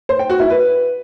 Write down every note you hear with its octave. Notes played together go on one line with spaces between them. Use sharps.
C5
G5
F#4
E4
B4